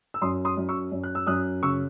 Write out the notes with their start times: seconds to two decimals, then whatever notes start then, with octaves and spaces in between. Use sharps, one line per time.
0.14 E6
0.22 F#2 C6 D#6
0.45 C6 D#6
0.57 F#2
0.69 C#6 E6
0.92 F#2
1.04 F#6
1.15 E6
1.27 F#2 D#6 F#6
1.63 C#3 C#6 E6